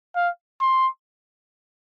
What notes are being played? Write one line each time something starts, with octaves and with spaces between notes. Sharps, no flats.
F5
C6